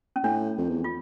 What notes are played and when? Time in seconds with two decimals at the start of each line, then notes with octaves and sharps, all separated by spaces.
0.16 C#4
0.24 A2 D4
0.58 F2
0.69 E2
0.84 F4